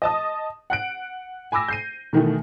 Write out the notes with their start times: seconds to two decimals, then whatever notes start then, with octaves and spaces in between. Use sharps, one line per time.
0.02 D#5 A5 D#6
0.70 F#5 F#6 D7
1.52 G#5 B5 D6 E6 A#6
1.68 G6 C7 D#7
2.13 B2 D#3 E3 A3